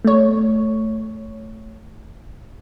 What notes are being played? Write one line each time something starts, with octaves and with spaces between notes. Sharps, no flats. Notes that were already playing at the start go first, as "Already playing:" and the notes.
A3 C#5